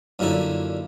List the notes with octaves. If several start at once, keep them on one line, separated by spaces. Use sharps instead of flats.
F#2 A#2 D3 D#4 E4